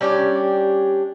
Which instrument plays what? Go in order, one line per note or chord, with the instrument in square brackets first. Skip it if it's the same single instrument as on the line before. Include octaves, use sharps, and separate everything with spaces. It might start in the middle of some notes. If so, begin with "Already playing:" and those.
[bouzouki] G3 C#4 D4 G4